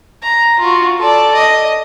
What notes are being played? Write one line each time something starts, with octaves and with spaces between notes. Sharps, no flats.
A#5
F4 F#4
A4 D5
D#5